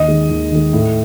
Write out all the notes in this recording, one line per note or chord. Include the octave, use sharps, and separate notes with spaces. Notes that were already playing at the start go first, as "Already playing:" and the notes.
Already playing: D#2 D#5
D#3 G#3
D#2
D#3 G#3
A2